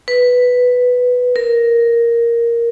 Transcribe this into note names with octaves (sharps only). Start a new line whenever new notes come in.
B4
A#4